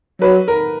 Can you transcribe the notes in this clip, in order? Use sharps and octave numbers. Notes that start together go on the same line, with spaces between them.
F#3 B4
A#4